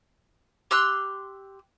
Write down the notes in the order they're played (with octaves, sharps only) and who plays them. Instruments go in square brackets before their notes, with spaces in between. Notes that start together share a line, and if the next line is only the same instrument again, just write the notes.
[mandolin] G4 C6 E6 F#6